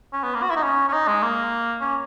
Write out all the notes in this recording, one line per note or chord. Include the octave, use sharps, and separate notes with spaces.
C#4
B3
A#3
F#4
E4
D#4
C#4
C#4
D#4
G#3
A#3
C#4